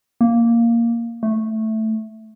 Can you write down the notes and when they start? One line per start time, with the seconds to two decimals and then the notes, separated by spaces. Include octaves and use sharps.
0.21 A#3
1.23 A3